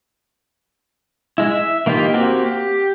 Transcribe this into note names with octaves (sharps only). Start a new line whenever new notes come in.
G#3 E4
E5
E3 A#3 D#4 F4 G4
A#3 C4 F#4 G4
G4